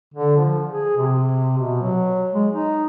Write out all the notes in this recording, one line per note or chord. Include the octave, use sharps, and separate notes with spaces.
D3
F3
G#4
C3
B2
F#3
G#3
D#4